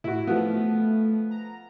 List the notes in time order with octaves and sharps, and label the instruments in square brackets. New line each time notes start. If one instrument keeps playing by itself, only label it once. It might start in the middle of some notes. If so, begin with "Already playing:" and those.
[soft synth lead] A2 [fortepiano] E4 F#4
[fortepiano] F3 B3 [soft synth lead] A3
[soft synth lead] A#5